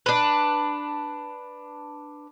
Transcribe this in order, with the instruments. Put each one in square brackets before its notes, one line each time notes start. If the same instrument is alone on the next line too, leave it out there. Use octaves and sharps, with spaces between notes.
[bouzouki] D4 B4